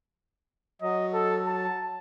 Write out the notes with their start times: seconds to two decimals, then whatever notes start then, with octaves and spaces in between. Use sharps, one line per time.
0.82 F#3 D#5
1.13 A4
1.47 A5